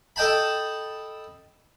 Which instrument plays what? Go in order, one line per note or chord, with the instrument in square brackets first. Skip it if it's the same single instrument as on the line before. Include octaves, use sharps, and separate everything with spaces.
[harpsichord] A4 D#5 G5 A5 B5